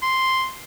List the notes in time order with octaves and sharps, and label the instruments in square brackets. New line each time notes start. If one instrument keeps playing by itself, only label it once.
[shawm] C6